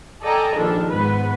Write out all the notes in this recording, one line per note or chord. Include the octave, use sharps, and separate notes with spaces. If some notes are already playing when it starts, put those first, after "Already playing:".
A4 D5 D#5 G5 G#5 A#5
A#1 D#3 D4 A4
G#2 B3 B4